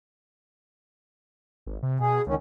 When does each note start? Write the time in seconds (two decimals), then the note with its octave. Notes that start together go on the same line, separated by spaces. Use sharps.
1.66 G#1
1.83 C3
2.00 B2 G#4
2.27 C#2 D#3 C#4